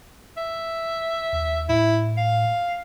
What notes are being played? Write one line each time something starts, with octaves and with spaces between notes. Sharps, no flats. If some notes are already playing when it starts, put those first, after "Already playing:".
E5
D#2
A2 E4
F5